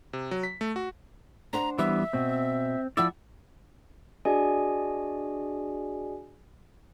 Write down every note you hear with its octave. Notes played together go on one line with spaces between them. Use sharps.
C3
F#3
B6
A3
F#4
D4 C5 F#5 A#5
E3 G3 B3 E5
B2 C4
F3 E4 D5 F#5 E6
D4 F#4 G#4 D5 D#5 G#5